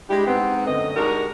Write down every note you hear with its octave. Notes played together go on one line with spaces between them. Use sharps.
G3 G#3 D4 E4 G4
G#2 B3 C4
F#2 D3 A3 D#5
G#3 D4 D#4 F#4 G4 A#4